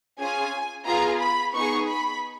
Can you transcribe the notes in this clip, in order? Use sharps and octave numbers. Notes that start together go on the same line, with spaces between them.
C#4 F4 G#4 G#5
B3 F4 G#4 A#5
B5
B3 D#4 G#4 C#6
B5